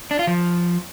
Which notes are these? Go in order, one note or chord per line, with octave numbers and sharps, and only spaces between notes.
D4
F4
F3